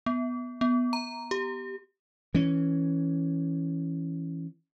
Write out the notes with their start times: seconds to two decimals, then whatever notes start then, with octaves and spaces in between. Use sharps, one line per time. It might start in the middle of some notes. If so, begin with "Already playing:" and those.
0.06 B3
0.61 B3
0.93 A#5
1.31 G4
2.35 E3 C#4